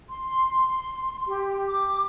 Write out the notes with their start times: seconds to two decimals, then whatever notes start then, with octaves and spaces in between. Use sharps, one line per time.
0.08 C6
1.25 G4
1.67 D6